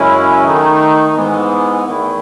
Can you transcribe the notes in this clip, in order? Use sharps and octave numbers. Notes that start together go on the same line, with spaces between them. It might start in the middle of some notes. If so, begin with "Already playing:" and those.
Already playing: F#2 C#3 G#3 C#4 E4
D#3 A3 D#4
G#2 E3 G#3 B3
E2 D#3 A3 E4